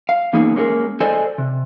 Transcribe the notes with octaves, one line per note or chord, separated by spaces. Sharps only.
F5
E3 A#3 B3 C#4 D#4 G#4
G#3 A#3 C#4 F#4 G#4 A#4
G#4 A4 C5 D5 D#5 G#5
C3